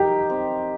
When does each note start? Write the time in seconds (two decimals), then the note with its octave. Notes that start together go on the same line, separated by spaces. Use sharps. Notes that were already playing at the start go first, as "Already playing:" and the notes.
Already playing: D#4 G4 A#4
0.30 C4